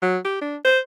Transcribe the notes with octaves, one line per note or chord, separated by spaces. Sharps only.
F#3
G4
D4
C5